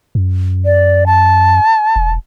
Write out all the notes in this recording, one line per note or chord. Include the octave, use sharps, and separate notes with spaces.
F#2
D5
A5
E1